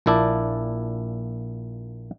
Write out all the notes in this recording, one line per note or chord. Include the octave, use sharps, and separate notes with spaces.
A#1 A#2 E4 D5 A5